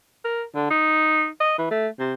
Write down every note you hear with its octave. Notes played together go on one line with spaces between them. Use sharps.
A#4
D3
D#4
D#5
E3
A3
C3